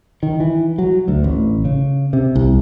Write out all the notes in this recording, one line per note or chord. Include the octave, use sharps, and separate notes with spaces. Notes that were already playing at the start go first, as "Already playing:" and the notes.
D#3
E3
F#3
D2
A1
C#3
C3
C2